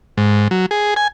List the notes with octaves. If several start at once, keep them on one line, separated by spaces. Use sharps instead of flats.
G#2
F#3
G#4
G#5